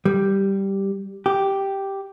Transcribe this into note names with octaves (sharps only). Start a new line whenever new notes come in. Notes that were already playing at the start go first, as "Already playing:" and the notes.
G3
G4